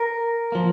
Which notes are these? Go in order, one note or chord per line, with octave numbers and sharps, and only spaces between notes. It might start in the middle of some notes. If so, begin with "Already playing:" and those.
Already playing: A#4
F3 A#3